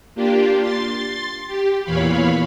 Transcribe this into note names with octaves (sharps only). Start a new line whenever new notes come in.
A#3 D4 F4 G4
C6 A6
G4
E2 A#2 E3 C#5 F5 B5